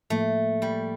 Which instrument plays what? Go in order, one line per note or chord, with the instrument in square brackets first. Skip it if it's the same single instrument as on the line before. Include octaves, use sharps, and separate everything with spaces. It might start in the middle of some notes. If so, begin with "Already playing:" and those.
[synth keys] A2 F3 A#3 [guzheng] A3
[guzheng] G3